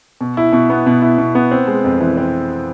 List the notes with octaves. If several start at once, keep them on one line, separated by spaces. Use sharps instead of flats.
B2
E4
B2
B3
B2
E4
B2
B3
C4
G#3
F2
E3
C4